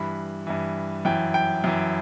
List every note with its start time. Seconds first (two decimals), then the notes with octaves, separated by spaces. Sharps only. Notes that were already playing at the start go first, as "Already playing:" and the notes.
Already playing: G2 E3 B5
0.47 G2 E3
1.05 F#2 E3 G5
1.34 G5
1.64 F#2 E3